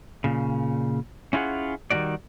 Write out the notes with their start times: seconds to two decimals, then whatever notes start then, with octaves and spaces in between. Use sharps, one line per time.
0.24 A#2 C#3
1.33 C#4 E4 F4 G#4 F#5
1.90 D#3 G3 G#3 D4 F#4 D5